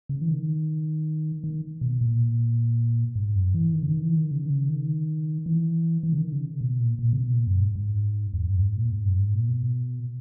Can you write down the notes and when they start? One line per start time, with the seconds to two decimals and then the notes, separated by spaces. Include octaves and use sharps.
0.09 C#3
0.22 E3
0.28 D#3
1.44 D#3
1.81 B2
2.01 A#2
3.16 G#2
3.35 F#2
3.54 E3
3.73 D#3
3.83 C#3
3.88 D#3
4.02 E3
4.16 D#3
4.31 C#3
4.46 D#3
4.50 C#3
4.69 D#3
5.46 E3
6.03 E3
6.13 C#3
6.18 D#3
6.32 C#3
6.61 B2
6.80 A#2
6.99 A#2
7.13 C#3
7.18 B2
7.33 A#2
7.47 F#2
7.61 G#2
7.75 G#2
8.34 E2
8.47 F#2
8.62 G#2
8.77 A#2
8.91 G#2
9.05 F#2
9.19 G#2
9.34 A#2
9.48 B2